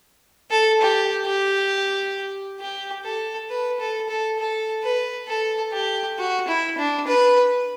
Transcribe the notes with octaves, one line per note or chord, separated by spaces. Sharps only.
A4
G4
G4
G4
A4
B4
A4
A4
A4
B4
A4
G4
F#4
E4
D4
B4